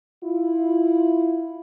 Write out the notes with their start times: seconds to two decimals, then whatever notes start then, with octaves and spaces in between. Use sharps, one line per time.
0.24 E4 F4